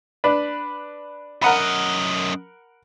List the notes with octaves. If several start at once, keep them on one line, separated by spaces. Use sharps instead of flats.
D4 B4
F#2 A#4 D#5 F#5 B5